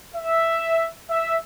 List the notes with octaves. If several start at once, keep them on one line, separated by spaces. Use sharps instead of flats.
E5
E5